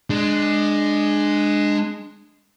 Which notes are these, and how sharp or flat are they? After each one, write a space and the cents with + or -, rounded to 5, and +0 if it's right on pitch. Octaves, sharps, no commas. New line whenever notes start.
G#3 +0 D4 +20